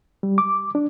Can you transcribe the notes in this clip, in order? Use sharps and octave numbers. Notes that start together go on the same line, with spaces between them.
G3
D6
D4